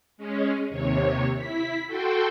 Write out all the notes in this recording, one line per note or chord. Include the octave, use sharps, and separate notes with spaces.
G#3 C#4
D#2 C3 C#5
E4 B6
F#4 A4 G5 C6